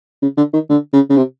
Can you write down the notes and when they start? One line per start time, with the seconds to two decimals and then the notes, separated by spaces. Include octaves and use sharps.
0.22 C#3
0.37 D3
0.53 D#3
0.69 D3
0.93 C#3
1.10 C#3
1.17 C3